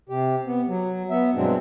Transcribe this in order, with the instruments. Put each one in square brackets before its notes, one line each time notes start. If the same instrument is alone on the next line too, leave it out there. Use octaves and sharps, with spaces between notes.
[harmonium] C3 G4
B3
F#3
B3 E5
G2 B2 F#3 G#3 C4 D4